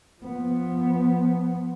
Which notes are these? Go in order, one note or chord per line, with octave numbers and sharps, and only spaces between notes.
F3 B3